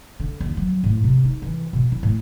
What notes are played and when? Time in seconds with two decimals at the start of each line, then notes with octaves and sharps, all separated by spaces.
0.20 D3
0.40 D#2
0.57 F#3
0.84 A2
1.04 C3
1.24 D#4
1.42 E3
1.73 B2
1.92 E4
2.03 A2